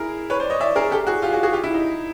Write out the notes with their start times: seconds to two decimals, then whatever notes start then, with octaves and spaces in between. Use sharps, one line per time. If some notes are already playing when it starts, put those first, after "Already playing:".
Already playing: E4 G#4 A#4
0.30 B4 C#5
0.40 C5 D5
0.50 C#5 D#5
0.60 D5 E5
0.76 G#4 A#4
0.91 G4 A4
1.07 F#4 G#4
1.22 F4 G4
1.33 F#4 G#4
1.43 F#4 G#4
1.53 F4 G4
1.64 E4
1.74 D#4